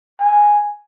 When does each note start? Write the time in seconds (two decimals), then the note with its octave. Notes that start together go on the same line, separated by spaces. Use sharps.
0.20 G#5